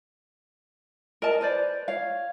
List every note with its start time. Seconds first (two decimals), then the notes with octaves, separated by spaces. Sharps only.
1.22 A#4 D#5 A5
1.41 B4 C5 D5
1.88 C#5 F5